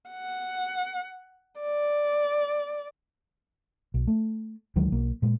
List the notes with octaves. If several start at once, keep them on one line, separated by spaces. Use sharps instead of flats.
F#5
D5
B1
A3
D2 D#3 F#3 G#3
B1 A#3
A#2 G#3